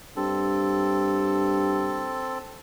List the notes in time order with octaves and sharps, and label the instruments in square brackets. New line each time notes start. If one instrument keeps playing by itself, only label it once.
[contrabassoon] G2 [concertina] C4 A4